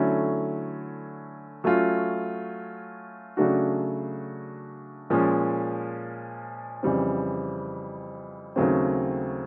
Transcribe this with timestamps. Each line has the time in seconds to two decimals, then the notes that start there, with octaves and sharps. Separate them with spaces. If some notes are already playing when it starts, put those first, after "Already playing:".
Already playing: D3 F#3 A3 C#4 E4
1.64 F#3 A3 C#4 F4
3.37 C#3 F#3 A3 D4 F#4
5.10 A#2 F3 G#3 C#4
6.83 F2 C#3 E3 G3 C4
8.56 D#2 C#3 F#3 A3 C4